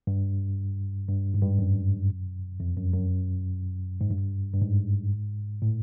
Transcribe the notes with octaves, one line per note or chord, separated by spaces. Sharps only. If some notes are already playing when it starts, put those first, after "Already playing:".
G2
G2
G#2
G2
F#2
F2
F#2
F#2
G#2
G2
G2
G#2
A2